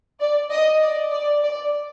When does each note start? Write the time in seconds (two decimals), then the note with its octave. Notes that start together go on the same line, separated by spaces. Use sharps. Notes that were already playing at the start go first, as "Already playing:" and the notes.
0.20 D5
0.51 D#5
0.82 D5
1.12 D5
1.43 D5